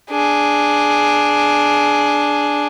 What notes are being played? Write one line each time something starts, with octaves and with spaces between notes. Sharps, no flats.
D4 G#4